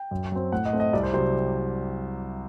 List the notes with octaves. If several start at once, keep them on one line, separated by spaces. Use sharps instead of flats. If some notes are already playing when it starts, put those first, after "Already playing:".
Already playing: G5
F#2
F#3 C4
A2 F#5
D#5
A3 C4
D#5
C2 D5
C5
C3 F#3 C5